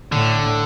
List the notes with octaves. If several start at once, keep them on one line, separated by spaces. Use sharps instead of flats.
A2 D3